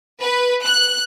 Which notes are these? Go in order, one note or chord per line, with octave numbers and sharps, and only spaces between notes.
B4
F#6